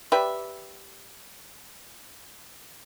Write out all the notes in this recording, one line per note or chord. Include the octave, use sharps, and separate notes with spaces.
G4 B4 D5 E5